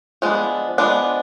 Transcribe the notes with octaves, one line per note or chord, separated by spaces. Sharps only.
F3 G#3 B3 D4
F3 G#3 B3 D4